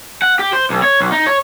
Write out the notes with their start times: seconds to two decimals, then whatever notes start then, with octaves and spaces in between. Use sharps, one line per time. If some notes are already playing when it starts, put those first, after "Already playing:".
0.22 F#5
0.39 G4
0.53 C5
0.70 B1
0.82 C#5
1.01 B1
1.12 D#4
1.27 C#5